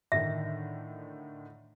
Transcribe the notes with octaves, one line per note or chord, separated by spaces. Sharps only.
A2 D3 D#3 E5